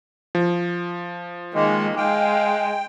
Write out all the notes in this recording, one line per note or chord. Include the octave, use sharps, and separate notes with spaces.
F3
D#3 G#3 A#3
G#3 F5 G5